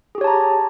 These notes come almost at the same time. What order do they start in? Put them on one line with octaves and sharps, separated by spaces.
G#4 G4 C#5 A5 A#5